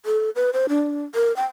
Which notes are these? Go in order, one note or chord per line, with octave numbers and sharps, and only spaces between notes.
A4
B4
C5
D4
A#4
G5